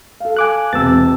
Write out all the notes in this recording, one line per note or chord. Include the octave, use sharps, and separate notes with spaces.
A4 F5
G#5 D6 F#6
E1 C3 E6 A6